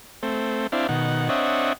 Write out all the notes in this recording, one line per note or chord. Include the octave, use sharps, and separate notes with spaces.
A3 C4
C4 D4 E4 F5
B2 D#3 F#5
C4 D4 C#5 D#5 E5 F#5